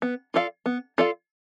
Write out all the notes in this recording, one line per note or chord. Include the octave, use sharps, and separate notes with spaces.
B3
F4 A4 D5 F5
B3
F4 A4 D5 F5